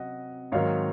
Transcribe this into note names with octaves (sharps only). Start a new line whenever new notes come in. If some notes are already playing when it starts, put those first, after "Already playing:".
Already playing: C3 F#3 C4 D#5 F#5
G#2 D#3 F#3 C4 C#5 F5